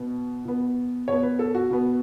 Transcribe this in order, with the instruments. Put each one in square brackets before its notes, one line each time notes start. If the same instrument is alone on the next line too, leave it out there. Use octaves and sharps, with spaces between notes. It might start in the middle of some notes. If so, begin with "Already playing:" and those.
Already playing: [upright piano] B2 B3
B2 B3
B2 B3 C#5
B4
A4
F#4
B2 B3